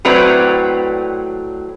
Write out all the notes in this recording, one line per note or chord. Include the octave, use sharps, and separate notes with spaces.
A2 F#3 C4 B4 D5 A#5